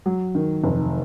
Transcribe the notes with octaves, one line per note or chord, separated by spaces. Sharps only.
F#3
D#3
F1